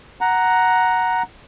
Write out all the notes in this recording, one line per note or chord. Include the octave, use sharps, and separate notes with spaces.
F#5 A#5